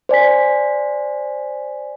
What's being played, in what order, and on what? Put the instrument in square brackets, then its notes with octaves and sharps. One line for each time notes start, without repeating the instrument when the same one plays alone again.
[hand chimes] C5 D5 G#5 B6